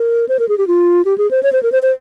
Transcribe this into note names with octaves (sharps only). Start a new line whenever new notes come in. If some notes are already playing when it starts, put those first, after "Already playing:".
Already playing: A#4
C5
A#4
G#4
G4
F4
G4
G#4
C5
C#5
C5
A#4
C5
C5